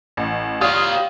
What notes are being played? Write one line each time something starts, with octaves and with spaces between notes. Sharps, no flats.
A1
F4 G4 C#5 D5 F5 D#6